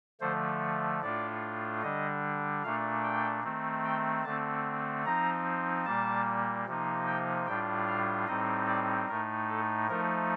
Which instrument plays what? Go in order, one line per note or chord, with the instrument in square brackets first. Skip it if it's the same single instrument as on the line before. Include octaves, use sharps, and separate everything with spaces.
[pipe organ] D3 F3 A3 C5
A2 A3 D4 F4 D5
D3 G3 D4 D#5
A#2 A3 D4 F5
G5
D#3 A3 C4
G5
D3 A3 C4 A5
F3 C4 D#4 A#5
A#2 G3 A#3 A5
C3 F3 A#3 D#4
G5
A2 G3 D4 F4 G5
F5
A2 G3 C4 D#4 D#5
D5
A2 A3 D#4 A#4
A4
F3 A3 D#4 A#4